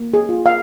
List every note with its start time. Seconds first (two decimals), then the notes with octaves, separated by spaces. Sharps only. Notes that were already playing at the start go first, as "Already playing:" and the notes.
Already playing: A#3
0.14 G#4
0.29 F4
0.46 F5